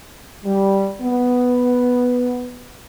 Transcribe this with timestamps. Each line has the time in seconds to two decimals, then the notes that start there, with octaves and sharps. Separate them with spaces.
0.46 G3
1.02 B3